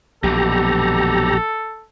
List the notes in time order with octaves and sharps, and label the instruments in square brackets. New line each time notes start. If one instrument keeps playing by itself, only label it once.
[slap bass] A#1 [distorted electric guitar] F#2 B2 [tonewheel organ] G4 A#5 [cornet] A4